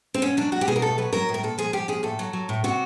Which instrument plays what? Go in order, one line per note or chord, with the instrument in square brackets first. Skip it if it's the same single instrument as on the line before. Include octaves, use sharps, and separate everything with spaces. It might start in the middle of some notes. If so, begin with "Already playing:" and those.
[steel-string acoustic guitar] C4
B2 C#4
F#3 D4
F#3 F#4
G4
B2 G#4
A#4
A2 A4
F#3 B4
F#3 A#4
A2
A#4
A#2 A4
F3 G#4
F3 G4
A#2 G#4
A2 A4
F#3
F#3
A2
C3 F#4